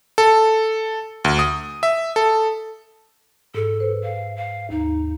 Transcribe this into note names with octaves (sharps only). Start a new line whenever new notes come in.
A4
D2
D#6
E5
A4
G#2 A4
B4 C5
F5
F5
D#2 D#4